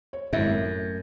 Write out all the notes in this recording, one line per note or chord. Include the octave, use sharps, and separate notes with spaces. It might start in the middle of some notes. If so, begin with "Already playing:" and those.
C#5
G#1 F#2 E4 E5
A2